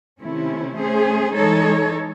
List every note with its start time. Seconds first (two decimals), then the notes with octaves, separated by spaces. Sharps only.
0.21 C3 D#3 A3 C#4 E4
0.76 A3 C#4 G#4 C5
1.32 E3 G#3 D#4 A4 C#5